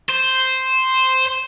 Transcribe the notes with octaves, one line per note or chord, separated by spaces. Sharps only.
C5